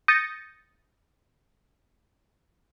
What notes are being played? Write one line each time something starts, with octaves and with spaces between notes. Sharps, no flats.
D#6 G6 A6 A#6 C#7 D#7